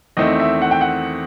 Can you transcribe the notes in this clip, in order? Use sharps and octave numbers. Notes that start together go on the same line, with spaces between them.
E2 D#3 A3 C4 D#5
E5
F#5
G5
F#5